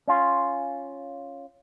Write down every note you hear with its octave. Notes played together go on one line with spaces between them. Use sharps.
C#4 F4